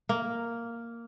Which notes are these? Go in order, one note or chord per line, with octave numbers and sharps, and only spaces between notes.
A#3